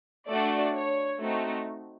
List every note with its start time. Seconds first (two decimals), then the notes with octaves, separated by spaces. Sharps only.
0.29 A3 D4 F#4 D5
0.75 C#5
1.20 A3 C4 D#4 F#4